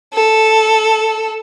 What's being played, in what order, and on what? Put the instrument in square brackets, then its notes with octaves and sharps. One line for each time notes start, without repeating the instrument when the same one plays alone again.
[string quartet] A4